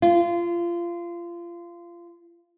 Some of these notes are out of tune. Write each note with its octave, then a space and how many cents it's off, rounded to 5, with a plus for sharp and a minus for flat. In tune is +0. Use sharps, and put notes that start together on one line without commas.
F4 -25